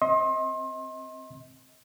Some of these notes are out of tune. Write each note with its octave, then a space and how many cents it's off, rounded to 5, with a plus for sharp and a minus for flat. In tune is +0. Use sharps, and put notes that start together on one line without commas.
C4 +0 D#5 +35 C6 +30